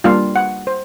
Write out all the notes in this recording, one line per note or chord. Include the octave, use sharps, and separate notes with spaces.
G3 A#3 D4 F4 F5
F#5
C5